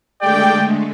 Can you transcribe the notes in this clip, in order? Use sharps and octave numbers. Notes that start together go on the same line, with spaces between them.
D3 G#3 A3 G4 D5 G5